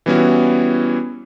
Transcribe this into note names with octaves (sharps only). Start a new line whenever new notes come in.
E3 G3 B3 C#4 E4 F#4